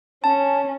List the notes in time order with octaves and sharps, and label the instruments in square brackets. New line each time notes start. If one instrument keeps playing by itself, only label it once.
[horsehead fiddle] C#4 [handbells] A5